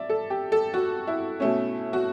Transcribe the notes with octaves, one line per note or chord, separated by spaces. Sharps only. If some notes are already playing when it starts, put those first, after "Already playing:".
Already playing: D5 E5
A4
G4
A4
F#4
E4
B2 A3 C#4
F#4